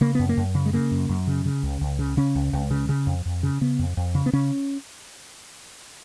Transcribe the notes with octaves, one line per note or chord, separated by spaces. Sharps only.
C#3 A#3
F#2 B3
A#3
F#2
C#3
G#3
C#3 A#3
F#2
F#2
C#3
C#3
C#2
C#2
C#3
C#3 C#4
C#2
C#2
C#3
C#3
F2
F2
C#3
C#3 B3
F2
F2
C#3
B3
C#3 C#4